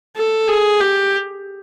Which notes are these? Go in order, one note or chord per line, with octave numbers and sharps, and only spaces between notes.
A4
G#4
G4